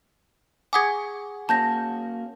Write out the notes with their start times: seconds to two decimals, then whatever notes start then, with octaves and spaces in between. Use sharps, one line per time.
0.73 G#4 F#5 G#5 D6 D#6 G#6
1.49 A#3 C#4 F#4 A5 G6 A#6